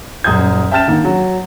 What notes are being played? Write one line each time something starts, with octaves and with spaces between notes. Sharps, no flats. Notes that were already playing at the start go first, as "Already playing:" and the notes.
D#1 F#2 D#6 G6 G#6
E5 G5 A5 F6 A6 E7
D3 D#3 A#3
F#3